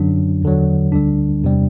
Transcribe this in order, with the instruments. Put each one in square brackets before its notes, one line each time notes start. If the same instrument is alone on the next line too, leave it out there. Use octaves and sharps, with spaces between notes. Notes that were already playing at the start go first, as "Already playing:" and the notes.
Already playing: [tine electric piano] F#2 D3 F#3 D4
E2 D3 F#3
D2 D3 G3 D4
E2 C3 G3